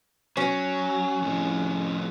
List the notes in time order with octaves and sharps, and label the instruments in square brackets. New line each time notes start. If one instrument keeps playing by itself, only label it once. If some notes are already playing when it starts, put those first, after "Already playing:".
[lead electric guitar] F#3 [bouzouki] C#4
[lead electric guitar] F2 A2